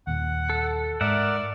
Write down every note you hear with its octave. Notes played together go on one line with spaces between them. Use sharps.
D#2 A#2 F#5
A4
G#2 A#4 D5 E5 F#5